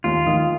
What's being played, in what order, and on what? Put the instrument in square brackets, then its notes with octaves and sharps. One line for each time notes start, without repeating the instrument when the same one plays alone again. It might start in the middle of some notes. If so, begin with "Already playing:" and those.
[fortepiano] D#2 [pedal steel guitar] F4
[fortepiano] D#3